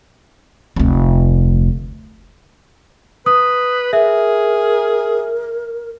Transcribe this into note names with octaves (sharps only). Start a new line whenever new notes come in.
F1 D2
B4 D#6
G#4 A#4 E5